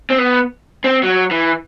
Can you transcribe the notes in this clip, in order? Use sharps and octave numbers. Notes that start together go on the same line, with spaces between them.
C4
B3
C4
F#3
E3